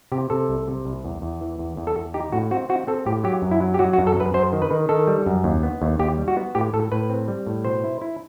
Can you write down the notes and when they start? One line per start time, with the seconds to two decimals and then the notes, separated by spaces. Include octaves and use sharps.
0.12 C3 G4
0.30 C3 A4
0.49 C2
0.68 C3
0.85 C2
1.04 E2
1.22 E2
1.41 E3
1.59 E2
1.77 E2
1.87 A4
1.95 E2
2.14 D#4 G4
2.32 A2 F#4
2.51 C4 F#4
2.69 C4 F#4
2.87 C4 A4
3.06 A2 G4
3.24 F#3 G4
3.42 F#2
3.51 E4
3.61 F#3
3.74 G4
3.79 F#3 F#4
3.93 F#4
3.98 F#2
4.07 A4
4.17 F#2 B4
4.34 F#2 C5
4.53 D#3
4.62 B4
4.71 D#3
4.89 D#3 A4
5.07 G3
5.26 F#2
5.44 D#2
5.63 B3
5.82 D#2
5.99 D#2 G4
6.18 G3
6.28 F#4
6.37 B3
6.55 A2 G4
6.73 A2 A4
6.92 A2 B4
7.10 C4
7.28 G3
7.47 A2
7.65 B2 C5
7.84 E4
8.01 E4